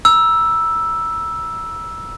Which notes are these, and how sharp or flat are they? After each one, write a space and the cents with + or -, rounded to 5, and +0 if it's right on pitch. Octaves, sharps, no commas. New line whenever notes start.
A#5 +35 E6 +0